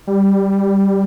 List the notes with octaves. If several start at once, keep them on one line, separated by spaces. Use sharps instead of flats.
G3